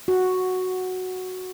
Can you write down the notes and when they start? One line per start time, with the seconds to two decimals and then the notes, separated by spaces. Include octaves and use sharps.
0.08 F#4